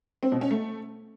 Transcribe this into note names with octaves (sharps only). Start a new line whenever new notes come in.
C4
B2
C#4
A3